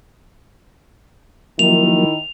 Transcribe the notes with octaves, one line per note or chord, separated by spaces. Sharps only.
D#3 F3 F#3 A#3 E4 F7